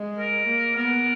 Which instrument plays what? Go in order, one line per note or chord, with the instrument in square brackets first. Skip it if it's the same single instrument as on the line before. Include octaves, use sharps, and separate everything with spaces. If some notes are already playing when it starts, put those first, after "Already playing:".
Already playing: [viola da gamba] G#3
[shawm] A#4
[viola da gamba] A#3
[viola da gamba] B3 [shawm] A#4